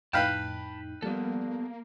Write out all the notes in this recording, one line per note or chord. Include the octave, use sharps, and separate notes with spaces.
F2 A2 D#4 B4 F5 G5 A5 B5
F3 G3 A#3 B3 A4 D5